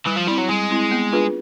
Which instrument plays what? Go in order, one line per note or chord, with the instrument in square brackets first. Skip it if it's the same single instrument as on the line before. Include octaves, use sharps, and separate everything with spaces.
[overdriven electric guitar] E3 [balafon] G3
[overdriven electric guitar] F3
[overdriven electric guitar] G3 [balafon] C4 E4
[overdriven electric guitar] F#3
[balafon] G3 [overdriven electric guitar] G#3
[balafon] C4 E4
B3
D4 F4 G#4 B4